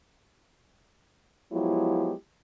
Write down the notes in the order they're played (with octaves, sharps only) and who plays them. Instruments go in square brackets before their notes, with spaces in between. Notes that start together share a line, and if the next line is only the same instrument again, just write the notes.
[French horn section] F3 F#3 G#3 B3 E4 G4